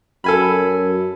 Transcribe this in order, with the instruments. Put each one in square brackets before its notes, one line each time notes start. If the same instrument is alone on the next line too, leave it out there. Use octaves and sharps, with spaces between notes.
[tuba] F#2 [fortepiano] A4 G#5 B5